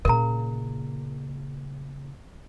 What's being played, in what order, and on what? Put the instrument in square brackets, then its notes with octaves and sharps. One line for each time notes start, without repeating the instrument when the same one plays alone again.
[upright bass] A#2 C#3 [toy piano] A#4 A#5